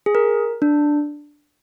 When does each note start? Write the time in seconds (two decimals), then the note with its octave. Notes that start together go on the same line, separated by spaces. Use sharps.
0.06 G#4
0.15 A#4
0.62 D4